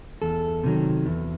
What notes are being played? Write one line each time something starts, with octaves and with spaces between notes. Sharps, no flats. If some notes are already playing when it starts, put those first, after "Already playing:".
E2 A4
C3 D#3 F#3
E2